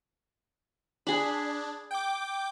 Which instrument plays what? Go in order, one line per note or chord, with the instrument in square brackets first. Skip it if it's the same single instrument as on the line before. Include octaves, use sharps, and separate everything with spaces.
[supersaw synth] D4 [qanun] G#4 B5
[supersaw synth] G5 D6